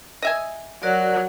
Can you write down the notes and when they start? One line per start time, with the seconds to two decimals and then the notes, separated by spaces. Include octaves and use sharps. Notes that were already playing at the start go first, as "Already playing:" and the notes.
0.22 D#5 E5 G#5
0.83 F#3 F#4 A#4 D5